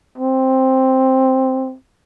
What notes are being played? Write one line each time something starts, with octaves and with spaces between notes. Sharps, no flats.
C4